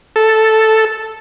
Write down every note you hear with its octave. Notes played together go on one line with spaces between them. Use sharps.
A4